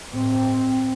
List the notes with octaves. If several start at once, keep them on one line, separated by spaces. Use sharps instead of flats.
A1 G2 C4